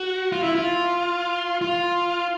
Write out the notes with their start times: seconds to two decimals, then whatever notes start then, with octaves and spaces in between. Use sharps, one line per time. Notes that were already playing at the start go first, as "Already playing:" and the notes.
Already playing: F#4
0.32 F4
0.43 E4
0.55 F4
1.61 F4